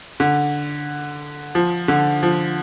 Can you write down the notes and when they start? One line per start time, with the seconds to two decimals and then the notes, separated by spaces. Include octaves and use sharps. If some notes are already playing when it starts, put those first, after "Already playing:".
0.20 D3
1.55 F3
1.88 D3
2.23 F3